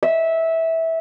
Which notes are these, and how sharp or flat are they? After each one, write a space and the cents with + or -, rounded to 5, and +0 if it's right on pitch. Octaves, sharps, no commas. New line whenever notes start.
E5 -15